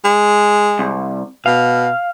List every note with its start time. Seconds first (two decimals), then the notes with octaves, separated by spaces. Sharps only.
0.04 G#3
0.79 C2
1.46 B2 F5